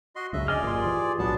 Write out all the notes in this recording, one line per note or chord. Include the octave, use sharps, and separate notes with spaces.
F#4 D#5 C6
C#2 F#2 C#3 D#5 E5
D2 G#4 D5 D#5 G#5 F6
G#1 F#2 A#2 F4 G4 C6
E3
B1 A2 F#3 B3 D4 A5